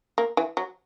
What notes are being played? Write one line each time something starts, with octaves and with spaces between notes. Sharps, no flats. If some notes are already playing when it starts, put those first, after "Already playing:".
A#3
E3
F#3